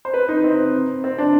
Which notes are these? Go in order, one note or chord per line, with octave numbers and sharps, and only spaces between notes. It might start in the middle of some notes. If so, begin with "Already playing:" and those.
C5
B4
D#4
C4
C4
D4